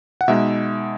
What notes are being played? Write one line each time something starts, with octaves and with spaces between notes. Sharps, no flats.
F#5
B2 G#3 D#4 E5